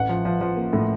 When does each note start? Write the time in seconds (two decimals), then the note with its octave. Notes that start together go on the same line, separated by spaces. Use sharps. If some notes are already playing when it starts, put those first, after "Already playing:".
Already playing: A1 F#5
0.09 F3
0.25 F3
0.41 F3
0.57 A#3
0.73 A2